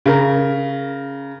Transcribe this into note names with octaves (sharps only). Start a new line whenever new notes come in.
C#3 A#4